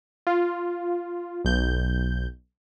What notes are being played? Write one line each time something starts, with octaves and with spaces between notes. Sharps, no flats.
F4
B1 G6